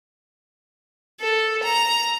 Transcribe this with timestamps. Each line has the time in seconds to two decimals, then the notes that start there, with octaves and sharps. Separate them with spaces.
1.21 A4
1.63 A#5